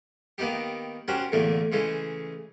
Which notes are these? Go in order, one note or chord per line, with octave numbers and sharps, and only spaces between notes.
D#3 A#3 B3 D#4 G4
C#4 D4 F#4 G4 A#4 C5
E2 A2 D3 A3 A#3
C#3 E3 G#3 A3